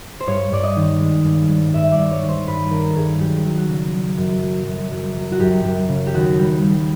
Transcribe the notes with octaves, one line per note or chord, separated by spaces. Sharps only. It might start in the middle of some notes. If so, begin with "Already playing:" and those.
C5
G2 C#5
G2 D5
D#5
D#3
G#3
G2
G2
G2 E5
D5
G2
C#5
D#3
C5
G2 B4
D#3 A#4
A4
G2 G#4
F#3 G4
F#3
F#4
C#3
F#3
F#2
F#3
F#2
F#2
F#3
F#4
F#2 G4
F#2
C#3
G4
D#2 F#4
G3
G3